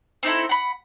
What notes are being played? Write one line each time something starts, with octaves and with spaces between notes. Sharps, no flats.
C4 D#4 E4 A4
F#5 B5